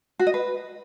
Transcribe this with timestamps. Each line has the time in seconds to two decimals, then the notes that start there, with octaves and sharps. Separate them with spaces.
0.19 F#4
0.27 D#5
0.34 B4